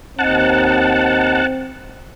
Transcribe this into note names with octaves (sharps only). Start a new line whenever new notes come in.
D#2 C4 D#4 F#5 A5